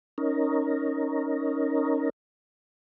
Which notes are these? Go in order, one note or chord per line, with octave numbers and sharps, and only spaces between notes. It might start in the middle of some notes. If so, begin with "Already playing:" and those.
C#4 D#4 A#4